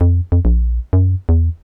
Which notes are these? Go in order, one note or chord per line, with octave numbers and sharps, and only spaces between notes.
F2
F2
A#1
F#2
E2